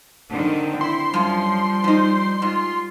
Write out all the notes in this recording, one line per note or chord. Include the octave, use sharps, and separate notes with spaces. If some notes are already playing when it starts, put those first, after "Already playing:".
D3 D#3 C4
E4 C6
F#2 F3 G3 F4
F3 D#4 C5
G#2 F4